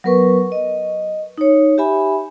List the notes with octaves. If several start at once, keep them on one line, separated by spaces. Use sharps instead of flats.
F#3 B3 A#4 B4 C#6
D#5
D#4 C#5
G4 E5 G#5 B5